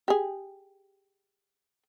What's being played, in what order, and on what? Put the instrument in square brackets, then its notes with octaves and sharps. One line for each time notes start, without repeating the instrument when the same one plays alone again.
[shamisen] G4 G#4